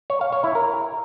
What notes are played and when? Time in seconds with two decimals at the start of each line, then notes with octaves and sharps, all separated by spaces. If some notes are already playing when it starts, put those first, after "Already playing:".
0.10 C#5
0.21 F5
0.32 C#5
0.44 E4
0.55 A#4